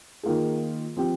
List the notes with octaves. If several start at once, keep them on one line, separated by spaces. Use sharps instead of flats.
D#3 A#3 F4 G#4
F3 C4 G4